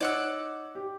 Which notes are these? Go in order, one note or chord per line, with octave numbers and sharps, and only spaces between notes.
D#4 C#5 D5 F#5 E6
G4